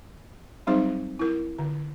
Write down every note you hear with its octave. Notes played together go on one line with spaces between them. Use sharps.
F#3 G3 C4 D#4 G#4 C5
E4 A#4
D3